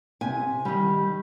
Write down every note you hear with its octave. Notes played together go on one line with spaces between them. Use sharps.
C3 G#5
D#3 G3